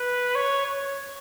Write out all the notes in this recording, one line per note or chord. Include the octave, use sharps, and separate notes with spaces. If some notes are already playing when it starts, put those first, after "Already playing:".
Already playing: B4
C#5
C#5